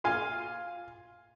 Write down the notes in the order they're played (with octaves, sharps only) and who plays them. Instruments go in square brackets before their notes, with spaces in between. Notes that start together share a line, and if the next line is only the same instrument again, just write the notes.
[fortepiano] F4 F5 G#5 C6